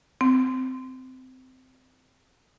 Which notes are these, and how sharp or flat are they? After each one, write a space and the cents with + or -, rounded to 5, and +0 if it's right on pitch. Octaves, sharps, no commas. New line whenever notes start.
C4 -20